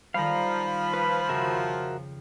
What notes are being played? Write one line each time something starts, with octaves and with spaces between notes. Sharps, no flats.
D#3 F3 G3 F5 A#5 B5
B4
F2 C#3 F#4 A#4 E5